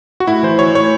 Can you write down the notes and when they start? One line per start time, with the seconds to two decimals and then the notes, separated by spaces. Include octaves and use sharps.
0.20 F#4
0.27 A2 E4
0.43 E3 C5
0.59 E3 C#5
0.75 A2 C#5